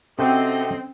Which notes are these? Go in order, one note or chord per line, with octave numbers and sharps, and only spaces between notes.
C3 C4 C#4 F#4 A4 D#5 G5